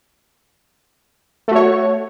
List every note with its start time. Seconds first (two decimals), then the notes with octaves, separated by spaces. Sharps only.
1.48 A3
1.51 F#4
1.55 C#5